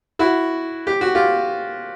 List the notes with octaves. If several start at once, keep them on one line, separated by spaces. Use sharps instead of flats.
E4 F#4
G4
F#4
F4 G4